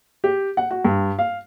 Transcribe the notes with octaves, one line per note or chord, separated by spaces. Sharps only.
G4
F#5
F#4
G2
F5